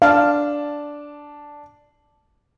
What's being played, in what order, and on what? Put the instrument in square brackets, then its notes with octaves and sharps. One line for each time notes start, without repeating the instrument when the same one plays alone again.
[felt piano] D4 A5 [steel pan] F5